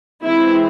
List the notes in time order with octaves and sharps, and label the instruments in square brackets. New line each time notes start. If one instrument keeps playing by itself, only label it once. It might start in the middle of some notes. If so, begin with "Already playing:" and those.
[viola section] E3 G#3 C4 E4